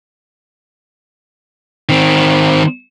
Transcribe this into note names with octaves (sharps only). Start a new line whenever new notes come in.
D#3 C4